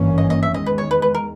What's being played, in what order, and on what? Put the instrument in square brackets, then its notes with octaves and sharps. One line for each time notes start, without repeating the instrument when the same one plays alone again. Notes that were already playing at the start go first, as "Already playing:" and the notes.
Already playing: [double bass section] G#1 G2 E3 A#3 C#4
[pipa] D#5
D#5
E5
[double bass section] E2 D#3 G#3 [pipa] D#5
[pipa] B4
C#5
B4
B4
A#4